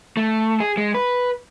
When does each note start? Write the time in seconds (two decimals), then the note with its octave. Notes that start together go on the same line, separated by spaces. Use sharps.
0.17 A3
0.60 G#4
0.77 G#3
0.94 B4